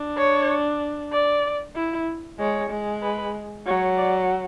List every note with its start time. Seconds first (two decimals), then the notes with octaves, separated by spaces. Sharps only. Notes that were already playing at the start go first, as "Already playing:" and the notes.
Already playing: D4
0.17 C#5
1.12 D5
1.76 E4
2.39 G#3 C#5
2.70 G#3
3.02 B4
3.66 F#3 C#5
3.98 D5